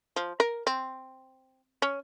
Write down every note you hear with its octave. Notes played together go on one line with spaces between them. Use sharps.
F3
A#4
C4
C#4